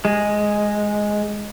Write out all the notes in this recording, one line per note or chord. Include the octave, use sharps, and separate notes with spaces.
G#3